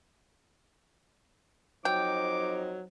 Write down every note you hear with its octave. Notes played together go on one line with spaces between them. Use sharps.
F2 F#3 D#4 C5 G5 D6